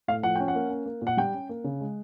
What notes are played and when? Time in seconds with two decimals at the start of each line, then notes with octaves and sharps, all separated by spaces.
0.08 A2 F5
0.23 F3 F#5
0.36 C#4 G5
0.48 F#5
0.55 A#3
0.70 C#4
0.86 A#3
1.02 A#2
1.07 F#5
1.17 G3 G5
1.34 C#4
1.49 A#3
1.64 C#3
1.81 G#3